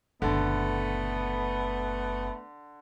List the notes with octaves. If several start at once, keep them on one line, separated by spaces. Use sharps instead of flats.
F#1 A#2 D3 A3 B3